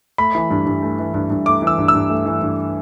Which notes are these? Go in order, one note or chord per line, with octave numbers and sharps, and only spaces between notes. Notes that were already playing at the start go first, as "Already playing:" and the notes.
A3 B5
E3
G2
G2
A3
E3
G2
G2
A3 D6
E3 E6
G2
E6
G2
A3
E3
G2